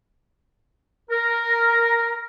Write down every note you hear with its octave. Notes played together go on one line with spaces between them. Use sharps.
A#4